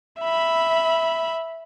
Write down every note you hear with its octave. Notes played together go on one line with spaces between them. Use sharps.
E5 B5